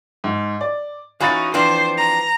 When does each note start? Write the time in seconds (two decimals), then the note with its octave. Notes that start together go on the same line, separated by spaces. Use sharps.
0.24 G#2
0.61 D5
1.20 E3 C#4 D#4 F#4 F5 B5 A6
1.54 E3 F3 C4 D4 C5
1.97 A#5